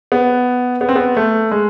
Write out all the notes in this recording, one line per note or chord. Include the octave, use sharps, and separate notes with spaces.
B3
B3
C4
B3
A3
G#3